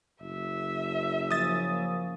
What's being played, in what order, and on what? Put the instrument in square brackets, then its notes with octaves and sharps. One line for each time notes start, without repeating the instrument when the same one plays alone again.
[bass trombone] F#1 [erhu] E5
[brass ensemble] F3 A#3 C#4 [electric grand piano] D#6 A6